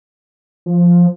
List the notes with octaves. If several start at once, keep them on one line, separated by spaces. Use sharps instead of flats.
F3